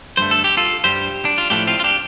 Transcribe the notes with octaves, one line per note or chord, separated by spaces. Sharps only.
G2 D3 A3 C5
A4
G4
F4 A4
G2 G3 G4 C5
D4
F4
A2 F3 A3 D4 G4
C4 F4
F4
D4 G4